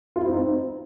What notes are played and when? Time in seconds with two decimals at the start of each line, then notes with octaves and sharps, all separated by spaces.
0.16 F4
0.21 E4
0.27 C4
0.32 D#4
0.38 C4